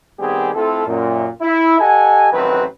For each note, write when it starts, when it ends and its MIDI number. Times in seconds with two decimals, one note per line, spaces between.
0.19 0.50 51
0.19 0.50 55
0.19 0.50 59
0.19 0.50 60
0.19 0.50 67
0.19 0.50 68
0.55 0.84 57
0.55 0.84 60
0.55 0.84 64
0.55 0.84 65
0.55 0.84 69
0.86 1.27 42
0.86 1.27 46
1.41 1.75 64
1.80 2.29 67
1.80 2.29 69
1.80 2.29 75
1.80 2.29 78
1.80 2.29 80
2.33 2.63 33
2.33 2.63 51
2.33 2.63 54
2.33 2.63 60
2.33 2.63 71